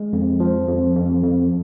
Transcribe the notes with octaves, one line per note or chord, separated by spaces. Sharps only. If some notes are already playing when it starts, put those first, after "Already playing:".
Already playing: G#3
F2
F3
F2
F2
F2